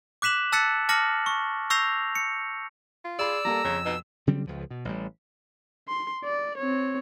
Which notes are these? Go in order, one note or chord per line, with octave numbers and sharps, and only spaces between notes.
D6 F#6 B6 E7 F#7
A5 E6 F#6 A6 B6 C#7
A5 D6 F6 A#6 C#7 F#7
C#6
C#6 E6 G6 A#6 C7 F7
C#7
F4
G#4 D5 B5 E6
G3 A#3 A4 A#5
F2 C#3
B2 D#4
C#3 F#3 G3 C4
C#2 F3
B2
A1 G3
C6
D5
C4 C#5